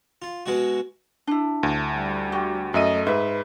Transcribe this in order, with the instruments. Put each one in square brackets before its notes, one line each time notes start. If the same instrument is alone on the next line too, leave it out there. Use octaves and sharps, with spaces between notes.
[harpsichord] F4
B2 G#3 F#4
[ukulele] D4 E4
[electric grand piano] D2
[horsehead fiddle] G3
[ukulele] F#4 G4
[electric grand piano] F#2 E5 D#7 [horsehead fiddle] A3 D#5
[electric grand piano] G#2 [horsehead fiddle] B4 [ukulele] E5